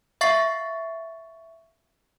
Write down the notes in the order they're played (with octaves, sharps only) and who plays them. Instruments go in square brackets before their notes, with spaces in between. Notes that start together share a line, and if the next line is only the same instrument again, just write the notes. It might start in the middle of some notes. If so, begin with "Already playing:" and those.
[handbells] E5 F5 C#6 A6 C7